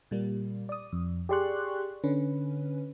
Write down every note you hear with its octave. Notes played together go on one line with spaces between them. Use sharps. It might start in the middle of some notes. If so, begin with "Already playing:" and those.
A#2 G3 A#3
D5 D#6
F2
G4 G#4 D5 C6 C#6 F#6
D3 C#4 B4